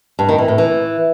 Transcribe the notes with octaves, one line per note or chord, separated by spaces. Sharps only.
G2
D#3
E3
A2
E3